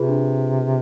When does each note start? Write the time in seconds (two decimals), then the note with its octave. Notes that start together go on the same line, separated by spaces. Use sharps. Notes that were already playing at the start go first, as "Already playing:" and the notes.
Already playing: C3 F4 G#4 B4
0.09 D4